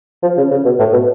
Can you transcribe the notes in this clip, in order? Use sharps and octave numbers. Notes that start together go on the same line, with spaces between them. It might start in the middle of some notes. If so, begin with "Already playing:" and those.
F3
C#3
C#3
B2
A2
B2